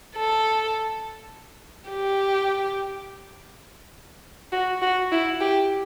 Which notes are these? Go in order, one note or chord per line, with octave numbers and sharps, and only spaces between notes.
A4
G4
F#4
F#4
E4
G4